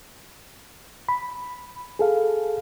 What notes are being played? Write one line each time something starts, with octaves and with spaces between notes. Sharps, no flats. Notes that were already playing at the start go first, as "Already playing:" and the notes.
B5
G#4 A4 F5